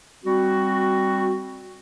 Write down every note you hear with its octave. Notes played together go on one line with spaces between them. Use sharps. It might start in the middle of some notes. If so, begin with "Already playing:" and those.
G3 C4 F#4